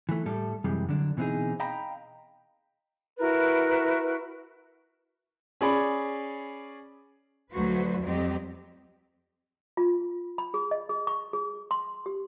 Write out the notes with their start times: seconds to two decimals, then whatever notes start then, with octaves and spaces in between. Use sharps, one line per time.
0.09 E3 A3
0.26 A2 G3 A4
0.64 F#2 C3 E3 G3 G#3
0.89 D3 F#3 D4
1.17 B2 E3 C4 D4 D#4 G#4
1.60 D#5 F5 G5 A#5 B5
3.19 E4 F#4 A#4 B4
5.61 C#4 G#4 D5 B5
7.52 D2 F3 F#3 F#4 B4 C5
8.02 F2 F#3 G3 C4 G4 D#5
9.77 F4
10.38 B5
10.54 G#4
10.71 D#5
10.89 G#4
11.07 C#6
11.33 G#4
11.71 C6
12.06 G4